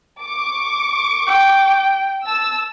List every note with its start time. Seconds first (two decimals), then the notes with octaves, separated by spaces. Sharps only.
0.24 C#6 D6
1.27 G5
2.26 A5 E6